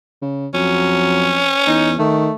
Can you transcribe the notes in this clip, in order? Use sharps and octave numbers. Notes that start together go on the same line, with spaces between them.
C#3
F2 F#3 C#4
E2 D#4
D#3 A3